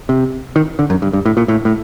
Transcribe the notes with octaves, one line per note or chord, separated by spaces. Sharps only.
C3
D#3
D3
F#2
G2
G2
A2
A#2
A2
A2